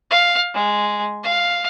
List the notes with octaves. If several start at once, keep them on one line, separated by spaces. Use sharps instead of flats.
F5
G#3
F5